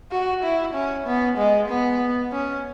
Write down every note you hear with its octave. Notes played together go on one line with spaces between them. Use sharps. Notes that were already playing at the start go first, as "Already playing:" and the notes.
F#4
E4
C#4
B3
G#3
B3
C#4